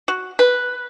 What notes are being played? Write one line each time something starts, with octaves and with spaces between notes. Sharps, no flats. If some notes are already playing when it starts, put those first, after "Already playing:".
F#4
B4